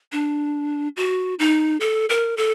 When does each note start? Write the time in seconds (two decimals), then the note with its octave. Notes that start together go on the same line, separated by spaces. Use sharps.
0.12 D4
0.97 F#4
1.39 D#4
1.80 A4
2.09 A#4
2.37 A4